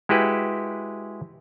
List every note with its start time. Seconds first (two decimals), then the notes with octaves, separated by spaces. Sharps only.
0.09 G#3 E4 F#4 G4 B4